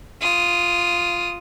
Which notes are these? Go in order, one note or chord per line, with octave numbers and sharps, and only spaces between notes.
F4 D#6